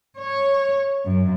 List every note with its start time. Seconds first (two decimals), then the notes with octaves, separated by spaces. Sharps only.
0.19 C#5
1.05 F#2